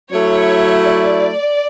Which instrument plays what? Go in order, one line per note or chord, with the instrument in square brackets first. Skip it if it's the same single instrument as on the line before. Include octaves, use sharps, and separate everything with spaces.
[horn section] F#3 A3 E4 [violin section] C#5
[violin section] D5